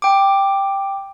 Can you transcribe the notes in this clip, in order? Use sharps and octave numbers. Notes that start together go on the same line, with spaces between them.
G5 D6